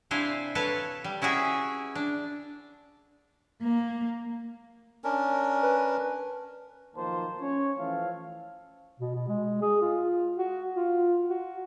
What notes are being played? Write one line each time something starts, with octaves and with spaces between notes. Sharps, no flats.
C3 D4 E4 C5 F5 G#5
A4 B4 C#5 F5 A5
G3
C#4 E4 F#4 G#4 E5
D4
A#3
C#4 D4 A#4
B4
B1 D#3 F3 A#3 C5 A5
C#4 C#5
E3 F3 A3 A4 F5
B2
B2
G#3
G#4
F4
F#4
F4
F#4